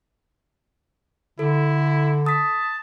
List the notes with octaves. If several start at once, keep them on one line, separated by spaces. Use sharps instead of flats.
D3 E4 A4
A5 D#6 B6